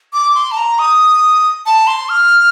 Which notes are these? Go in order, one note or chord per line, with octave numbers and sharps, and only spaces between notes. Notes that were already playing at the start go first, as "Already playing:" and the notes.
D6
C6
A5
A#5
D#6
A5
C6
F6